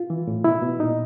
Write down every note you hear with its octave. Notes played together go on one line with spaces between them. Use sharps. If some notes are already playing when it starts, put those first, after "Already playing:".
Already playing: F4
E3
A2
B2 E4
B2
A#2 D#4